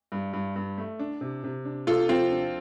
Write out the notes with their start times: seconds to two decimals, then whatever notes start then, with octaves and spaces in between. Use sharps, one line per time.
0.12 G2
0.33 G2
0.56 G2
0.78 A3
0.99 D4
1.21 C3
1.44 C3
1.65 D4
1.87 C3 F4 A4
2.09 F3 C4 F4
2.31 D4